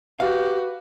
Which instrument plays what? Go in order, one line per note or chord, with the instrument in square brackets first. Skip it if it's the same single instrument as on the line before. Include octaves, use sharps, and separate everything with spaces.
[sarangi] F#4 [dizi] G4 [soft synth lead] B4 [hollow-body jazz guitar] F5